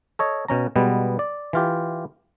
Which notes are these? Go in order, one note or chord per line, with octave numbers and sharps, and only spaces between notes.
A4 C#5 D#5
B2 C#4 A#5
B2 G3 G#3 B3
D5
E3 F4 G4